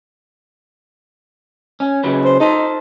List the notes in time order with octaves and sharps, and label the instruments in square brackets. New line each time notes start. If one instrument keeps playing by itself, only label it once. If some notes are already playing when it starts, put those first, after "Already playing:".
[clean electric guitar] C#4
C#3 F#3 B4
[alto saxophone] C5
[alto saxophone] D#4 [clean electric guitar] A4 C5